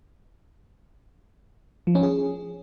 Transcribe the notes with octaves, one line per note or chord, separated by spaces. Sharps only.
F3
C#4
G#4